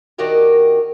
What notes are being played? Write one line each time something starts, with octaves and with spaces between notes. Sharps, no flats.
D#3 D4 F#4 G4 A#4 D#5